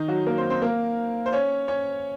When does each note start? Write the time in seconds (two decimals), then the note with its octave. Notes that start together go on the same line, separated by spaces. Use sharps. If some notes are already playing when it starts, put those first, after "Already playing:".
Already playing: D#3 D#4
0.08 F#3 F#4
0.26 A#3 A#4
0.38 C4 C5
0.50 C4 C5
0.62 A#3 A#4
1.26 C5
1.32 C#4 C#5
1.68 C#4 C#5